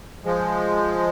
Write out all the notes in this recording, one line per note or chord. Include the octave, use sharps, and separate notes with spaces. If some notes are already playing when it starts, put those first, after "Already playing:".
F3 G#3